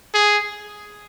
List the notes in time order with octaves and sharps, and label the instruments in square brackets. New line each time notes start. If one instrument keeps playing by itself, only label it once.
[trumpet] G#4